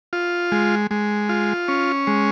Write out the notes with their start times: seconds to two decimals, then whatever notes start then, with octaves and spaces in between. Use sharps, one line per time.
0.13 F4
0.52 G#3
0.91 G#3
1.29 F4
1.68 C#4
2.07 G#3